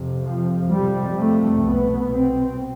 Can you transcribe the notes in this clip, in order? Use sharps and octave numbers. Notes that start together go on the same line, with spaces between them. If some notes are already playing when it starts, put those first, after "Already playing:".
Already playing: F2 C3
F3
F2 C3 G3
A3
C2 B2 B3
C4